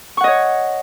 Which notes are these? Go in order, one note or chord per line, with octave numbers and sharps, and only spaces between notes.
C#5 D#5 F#5 C#6